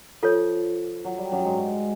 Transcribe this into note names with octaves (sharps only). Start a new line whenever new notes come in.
F3 F4 A4 C#5
F#3
G3
F#2 F#3
G#2 G#3